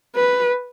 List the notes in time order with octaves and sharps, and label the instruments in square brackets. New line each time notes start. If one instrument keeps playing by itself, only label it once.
[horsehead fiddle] B4